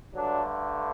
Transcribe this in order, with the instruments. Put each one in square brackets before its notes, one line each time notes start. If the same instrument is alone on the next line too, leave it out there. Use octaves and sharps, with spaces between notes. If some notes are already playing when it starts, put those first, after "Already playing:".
[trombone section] G2 D3 F#3 A3 D4